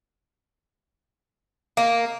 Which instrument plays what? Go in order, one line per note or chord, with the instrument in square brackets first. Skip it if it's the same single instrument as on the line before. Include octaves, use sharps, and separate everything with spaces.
[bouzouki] A#3